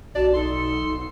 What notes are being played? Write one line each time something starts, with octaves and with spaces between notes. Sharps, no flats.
B1 F#4 D5 A5
D#4 A4 C6